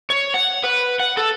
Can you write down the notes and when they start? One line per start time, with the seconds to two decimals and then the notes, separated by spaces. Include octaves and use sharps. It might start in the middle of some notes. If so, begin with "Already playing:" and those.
0.10 C#5
0.34 F#5
0.64 B4
1.00 F#5
1.17 A4